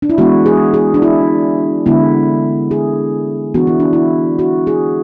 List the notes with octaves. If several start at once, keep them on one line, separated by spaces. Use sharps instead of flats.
D4
E4
E3 G#3 B3 D4 F#4
G#4
G#4
D4
E4
D3 G#3 B3 E4
G#4
E3 B3 D4 F#4
E4
D4
E4
F#4
G#4